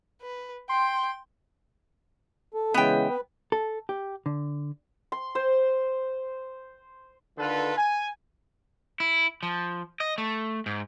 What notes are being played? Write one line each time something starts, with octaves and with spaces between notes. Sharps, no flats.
B4
G5 C6
A4
C#3 E3 G#3 B3 G5
B4
A4
G4
D3
C6
C5
D3 D#3 F4 A4 B4
G#5
E4
F3
D#5
A3
G#2